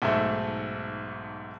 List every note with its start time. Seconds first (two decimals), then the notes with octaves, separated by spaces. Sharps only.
0.02 B1 G#2 A3 E5